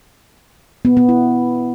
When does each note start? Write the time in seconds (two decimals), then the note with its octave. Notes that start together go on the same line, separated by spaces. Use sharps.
0.85 B3
0.97 B3
1.09 E4